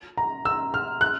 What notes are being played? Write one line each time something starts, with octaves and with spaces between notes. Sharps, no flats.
A#5
E6
F6
F#6